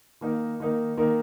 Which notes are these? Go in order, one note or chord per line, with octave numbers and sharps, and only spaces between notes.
D#3 A#3 D#4 A#4
D#3 A#3 D#4 A#4
D#3 A#3 D#4 A#4